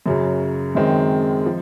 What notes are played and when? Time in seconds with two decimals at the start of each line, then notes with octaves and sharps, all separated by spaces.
0.06 F#2 C#3 F#3
0.75 F#2 D#3 G#3 C4
1.46 F3